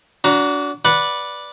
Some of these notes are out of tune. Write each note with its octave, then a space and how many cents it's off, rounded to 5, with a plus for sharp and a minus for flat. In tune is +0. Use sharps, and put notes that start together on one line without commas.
D4 -30 F#4 +0 A#5 +10
B4 -10 D5 +0 F#5 -10